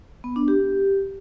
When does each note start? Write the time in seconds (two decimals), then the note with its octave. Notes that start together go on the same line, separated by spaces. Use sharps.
0.24 B3
0.36 D4
0.48 G4